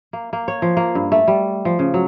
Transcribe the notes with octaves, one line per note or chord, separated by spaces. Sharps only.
A#3
A#3
C#5
F3
A#3
G2
A3
G3
F3
C#3
F#3